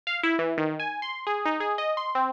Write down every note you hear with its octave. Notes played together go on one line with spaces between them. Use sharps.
F5
E4
E3
D#3
G#5
C6
G#4
D#4
G#4
D#5
C6
C4